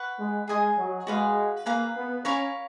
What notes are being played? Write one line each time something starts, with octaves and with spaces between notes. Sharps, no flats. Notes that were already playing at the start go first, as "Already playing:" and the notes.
Already playing: B4 F#5 C#6
G#3
G#3 G#4 D#5 G#5 D#6
F#3
G#3 F#4 B4 F5
A#3 G#4 B4 F5 A#5
B3
C#4 A#4 C#5 F5 B5